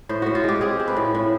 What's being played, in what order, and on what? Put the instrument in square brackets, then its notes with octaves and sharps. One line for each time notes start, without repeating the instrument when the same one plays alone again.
[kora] A2 C5
A2 F#4
F4
G#3 G4
C4 G#4
C4
B4
A2
A2